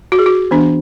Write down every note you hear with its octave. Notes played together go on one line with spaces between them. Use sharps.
F#4
G#4
F#4
E3 B3 D4